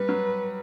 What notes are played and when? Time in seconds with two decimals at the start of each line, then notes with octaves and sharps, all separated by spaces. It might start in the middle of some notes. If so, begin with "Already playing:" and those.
Already playing: G3 B4
0.09 F#3